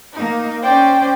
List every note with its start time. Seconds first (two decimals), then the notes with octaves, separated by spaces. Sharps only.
0.14 A#3 D#4
0.62 C#4 C5 D5 G5